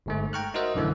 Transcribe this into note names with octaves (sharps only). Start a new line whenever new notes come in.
G1 G#2 A3
G5 A#5 C#6 F6 F#6
D#4 F#4 A#4 C5 D#5 E5
A#1 F#2 D3 E3 A3